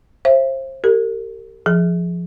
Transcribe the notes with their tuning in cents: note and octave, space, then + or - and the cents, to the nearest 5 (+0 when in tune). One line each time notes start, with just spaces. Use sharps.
C5 +30 E5 +30
G4 -5 A#4 -40
F3 -5 G#4 +15